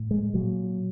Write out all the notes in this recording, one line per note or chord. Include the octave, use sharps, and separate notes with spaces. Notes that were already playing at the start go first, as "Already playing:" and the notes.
Already playing: A2
G#3
A#2 F#3